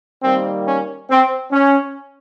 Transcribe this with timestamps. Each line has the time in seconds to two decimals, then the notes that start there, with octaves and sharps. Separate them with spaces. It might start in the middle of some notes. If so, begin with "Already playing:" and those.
0.23 D#3 G3 A#3 C4
0.66 C#4
1.09 C4
1.52 C#4